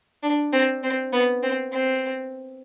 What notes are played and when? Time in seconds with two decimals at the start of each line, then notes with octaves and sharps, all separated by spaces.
0.23 D4
0.52 C4
0.83 C4
1.13 B3
1.42 C4
1.72 C4